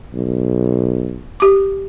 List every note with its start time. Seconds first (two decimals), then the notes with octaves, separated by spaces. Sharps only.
0.14 B1
1.40 G4 D6